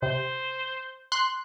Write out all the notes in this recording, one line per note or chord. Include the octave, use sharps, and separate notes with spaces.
C3 C5
C6 F#6